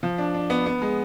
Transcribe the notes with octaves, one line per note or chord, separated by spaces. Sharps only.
F3
D4
D4
B3
B3
G#3